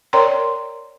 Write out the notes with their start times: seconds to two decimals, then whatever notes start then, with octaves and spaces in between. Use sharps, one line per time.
0.13 A#4 C#5 D5 G5 A#5 C6